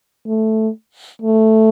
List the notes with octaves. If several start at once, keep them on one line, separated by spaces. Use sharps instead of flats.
A3
A3